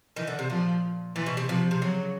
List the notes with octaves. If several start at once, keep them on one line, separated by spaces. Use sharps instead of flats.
D#3 E3
D3
C3
A#2 F3
A#2 E3
B2
C3
C3 F3
C3
C#3 F#3